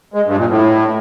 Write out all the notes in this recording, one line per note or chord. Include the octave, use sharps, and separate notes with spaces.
G#3
G2
A#2
A2